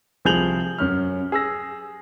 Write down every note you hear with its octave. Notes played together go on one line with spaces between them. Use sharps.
C2 F3 G#4 G6 F7 F#7
F#2 C#4 F6
G#4 E6 A#6